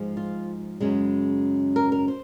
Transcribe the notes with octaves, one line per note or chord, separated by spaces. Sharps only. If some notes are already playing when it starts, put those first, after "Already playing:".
Already playing: G#2 F3 G#3
F4
F#2 C#3 G#3
A#4
A#4
C5